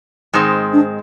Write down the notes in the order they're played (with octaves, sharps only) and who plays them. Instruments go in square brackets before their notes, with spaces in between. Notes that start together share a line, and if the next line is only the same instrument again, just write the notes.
[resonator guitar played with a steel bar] G#2 D#3 G#3 C4
[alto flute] D4